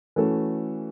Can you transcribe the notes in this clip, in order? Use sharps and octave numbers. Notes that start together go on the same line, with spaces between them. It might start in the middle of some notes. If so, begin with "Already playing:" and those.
E3 A3 C#4 F#4 A4